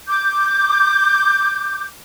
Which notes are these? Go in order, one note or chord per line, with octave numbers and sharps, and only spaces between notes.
D6 G6